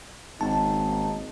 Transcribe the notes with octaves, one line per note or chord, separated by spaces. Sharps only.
G#1 C#3 A#3 D#4 A5